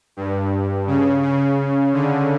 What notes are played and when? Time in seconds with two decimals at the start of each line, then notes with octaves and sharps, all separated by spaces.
0.17 G2
0.87 C#3
1.23 C#3
1.93 D3